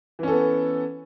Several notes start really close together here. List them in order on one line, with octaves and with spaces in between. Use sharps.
E3 C#4 A4 B3